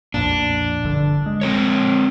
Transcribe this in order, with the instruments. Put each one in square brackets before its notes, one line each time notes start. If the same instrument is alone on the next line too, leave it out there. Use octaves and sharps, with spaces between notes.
[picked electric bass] B1 F2 A#2 [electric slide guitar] D4
[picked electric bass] F1 G2 D3
G#3
[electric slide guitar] C4 A#4 C#5